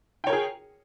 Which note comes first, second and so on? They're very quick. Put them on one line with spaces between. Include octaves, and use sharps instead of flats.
G5 C#5 A#4 G#4